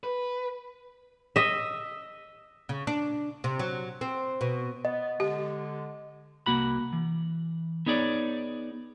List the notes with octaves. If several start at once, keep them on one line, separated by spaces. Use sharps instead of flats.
B4
D#5 E5
C#3
D4
C3
F#3
C4
B2
B3 D#5
D3 G#3 G4
C2 A#3 F#4 B5
E3
B3 D#4 G#4 C#5 D5